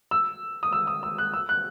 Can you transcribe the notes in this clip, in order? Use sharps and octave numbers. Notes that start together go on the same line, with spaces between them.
E6
D#6
E6
D#6
E6
F#6
E6
F#6